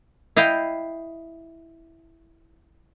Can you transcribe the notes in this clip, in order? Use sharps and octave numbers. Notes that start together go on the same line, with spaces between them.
E4 D#5 F5 G5